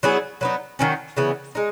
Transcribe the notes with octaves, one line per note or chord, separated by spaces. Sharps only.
F#3 B3 E4 G#4
F#3 B3 D#4
D#3 F#3 C#4
C#3 E3 B3
G#3 D#4